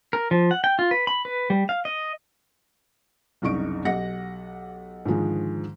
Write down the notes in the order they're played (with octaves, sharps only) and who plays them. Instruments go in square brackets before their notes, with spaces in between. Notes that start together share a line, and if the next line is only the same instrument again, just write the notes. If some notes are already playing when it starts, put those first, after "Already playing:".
[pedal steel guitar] A#4
F3
F#5
G5
F4
B4
B5
B4
G3
F5
D#5
[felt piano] F#1 C2 D#4 C#6 D7
B1 G4 D#5 F#5 A#6 C#7
G#2 D3 D#3 F3 G#3